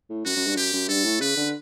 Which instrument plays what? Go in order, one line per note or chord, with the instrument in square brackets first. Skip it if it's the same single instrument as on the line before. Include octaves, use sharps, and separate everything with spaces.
[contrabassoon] A2
[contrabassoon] F#2 [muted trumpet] F#4
[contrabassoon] F#2
G2
[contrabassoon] F#2 [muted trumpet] G4
[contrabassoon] F#2
[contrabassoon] G2 [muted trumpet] A4
[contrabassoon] A2
[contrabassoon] C#3 [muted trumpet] B4
[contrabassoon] D3